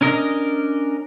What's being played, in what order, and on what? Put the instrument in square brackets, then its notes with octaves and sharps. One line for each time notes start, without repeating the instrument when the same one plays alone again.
[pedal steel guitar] C#4 D4 A#4 D#5